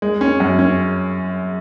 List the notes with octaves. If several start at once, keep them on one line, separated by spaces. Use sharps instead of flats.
G#3
C#4
F#2
C#4